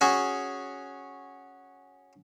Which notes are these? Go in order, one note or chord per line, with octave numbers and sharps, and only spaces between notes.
C#4 F#4 G#4